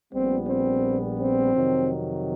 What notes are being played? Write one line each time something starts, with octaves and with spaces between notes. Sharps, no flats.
A#1 A#2 G3 B3 C4
C4
C4
F2 C3 D#3 F#3